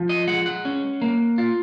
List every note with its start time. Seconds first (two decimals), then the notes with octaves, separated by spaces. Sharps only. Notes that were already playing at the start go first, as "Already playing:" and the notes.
Already playing: F3
0.09 D#5
0.27 G#3 F#5
0.46 F#5
0.65 C#4
1.02 A#3
1.38 F4